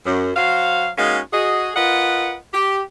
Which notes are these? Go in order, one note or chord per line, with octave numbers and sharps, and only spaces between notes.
F#2
F#3 F#4 C5 F5
G#3 A#3 C#4 D#4 F#4 F5
F#4 G#4 D#5
F4 A#4 B4 D#5 F#5
G4